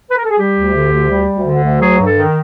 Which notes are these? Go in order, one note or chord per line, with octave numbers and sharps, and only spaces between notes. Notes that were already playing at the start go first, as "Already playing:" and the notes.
B4
A#4
A4
G#4
G3 G4
D2
D3
D2
G3
D2
D3
D2
F#3 G#4
G2
A4
D#3